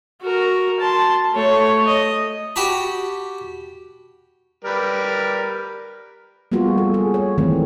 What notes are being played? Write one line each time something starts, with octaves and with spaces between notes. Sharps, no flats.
F#4 A#4
A5 C6
A3 C#5
D#5
F#4 G4 A5 B5
G3 A#4 B4
G3 A#3 B3 F4 F#4 G#4
A4
G#4
C#5
D#3 E3 A3 C4